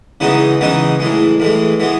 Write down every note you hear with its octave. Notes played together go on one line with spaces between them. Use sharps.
C#3 E3 G#3 B3 D#4
C#3 E3 G#3 B3 D#4
A2 E3 G#3
A2 E3 G#3
E3 G#3 B3